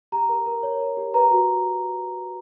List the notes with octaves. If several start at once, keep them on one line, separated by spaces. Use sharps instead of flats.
G4 A#5
A#4
A#4
C#5
A#4
G4
B4 A#5
F#4